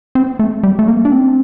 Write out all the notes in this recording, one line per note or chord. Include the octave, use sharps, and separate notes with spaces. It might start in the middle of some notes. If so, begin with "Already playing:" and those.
C4
A3
G3
A3
A#3
D4
C4